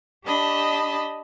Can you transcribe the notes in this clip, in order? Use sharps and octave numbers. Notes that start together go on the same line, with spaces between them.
D4 G4 D#5 A5 B5